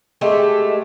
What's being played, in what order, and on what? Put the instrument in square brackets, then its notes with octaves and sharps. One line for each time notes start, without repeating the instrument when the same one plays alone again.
[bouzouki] G#3 A3 G4